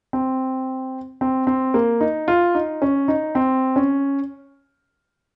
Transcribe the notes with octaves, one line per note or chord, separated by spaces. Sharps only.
C4
C4
C4
A#3
D#4
F4
D#4
C#4
D#4
C4
C#4